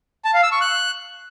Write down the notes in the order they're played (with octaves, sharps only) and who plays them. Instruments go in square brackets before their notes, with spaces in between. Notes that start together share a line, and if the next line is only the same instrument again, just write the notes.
[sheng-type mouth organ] A5
F5
E6
C#6
F#6